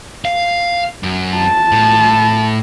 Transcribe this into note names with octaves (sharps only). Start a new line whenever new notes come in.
F5
F#2
A5
A2